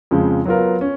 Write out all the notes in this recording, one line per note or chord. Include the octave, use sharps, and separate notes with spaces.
F2 C#3 F3 G#3
F#3 B3 F4 A#4
C#4